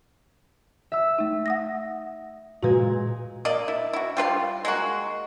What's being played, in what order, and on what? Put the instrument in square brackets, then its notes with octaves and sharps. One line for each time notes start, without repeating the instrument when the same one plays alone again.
[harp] E5 E6
[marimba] A3 D#4
F#5 D#6 A#6
[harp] A#2 G#3 G#6 [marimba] F#4 B4
[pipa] A#3 D5 D#5
E4
E4 F#4
G3 F4 B4 F5
G#3 A#3 F#4